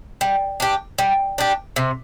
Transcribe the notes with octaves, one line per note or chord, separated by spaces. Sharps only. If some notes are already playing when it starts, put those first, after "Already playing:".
G3
D4 G4
G3
D4 G4
C3